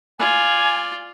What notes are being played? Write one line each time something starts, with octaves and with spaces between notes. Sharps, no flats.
F4 D5 G#5